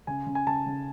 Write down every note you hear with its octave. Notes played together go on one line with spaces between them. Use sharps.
C#3 G#5
C#3
G#5
C#3 A5
C#3